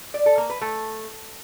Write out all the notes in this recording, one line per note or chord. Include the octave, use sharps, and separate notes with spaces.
D5
A4
A#3
B4
A3